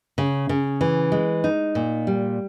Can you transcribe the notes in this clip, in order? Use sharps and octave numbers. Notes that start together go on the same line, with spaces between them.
C#3
C#3
E3
G#3
D#4
A#2
G3